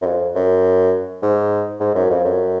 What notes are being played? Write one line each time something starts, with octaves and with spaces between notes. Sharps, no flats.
F#2
F2
F#2
G#2
G#2
F#2
F2
F#2